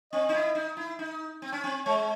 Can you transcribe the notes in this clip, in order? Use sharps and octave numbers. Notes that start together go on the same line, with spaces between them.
C4 D#5
D#4
E4
D#4
E4
D#4
C4
C#4
C4
G#3 C#5